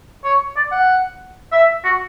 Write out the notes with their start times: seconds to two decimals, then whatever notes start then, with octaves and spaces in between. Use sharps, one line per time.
0.24 C#5
0.56 D5
0.72 F#5
1.52 E5
1.84 F#4